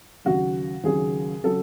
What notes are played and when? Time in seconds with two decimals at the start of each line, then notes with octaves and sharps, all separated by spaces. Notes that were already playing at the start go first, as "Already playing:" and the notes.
0.25 D#2 C#3 F#3 F#4
0.84 D#2 C#3 F#3 G#4
1.44 C#3 F#3 A4